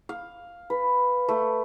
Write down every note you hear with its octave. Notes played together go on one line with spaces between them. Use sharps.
F5
B4
A3